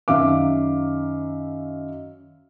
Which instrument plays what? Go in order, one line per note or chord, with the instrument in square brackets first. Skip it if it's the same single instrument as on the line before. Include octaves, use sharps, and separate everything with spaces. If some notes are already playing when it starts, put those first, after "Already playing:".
[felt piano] F#2 D#3 E5 F5 D6